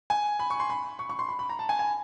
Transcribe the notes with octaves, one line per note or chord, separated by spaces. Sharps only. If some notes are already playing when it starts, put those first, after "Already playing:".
G#5
B5
C#6
C6
B5
C#6
C#6
C6
B5
B5
A#5
A5
G#5
G#5